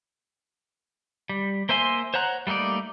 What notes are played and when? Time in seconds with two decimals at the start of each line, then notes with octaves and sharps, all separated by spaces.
1.29 G3
1.69 A#3 C5 E5 G#5 C6
2.14 C5 C#5 F#5 A#5 F#6
2.47 G3 A3 A#3 D#4 D5